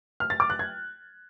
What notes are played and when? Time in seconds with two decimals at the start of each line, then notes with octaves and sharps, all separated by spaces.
0.20 F6
0.30 A6
0.40 D6
0.50 F#6
0.59 G#6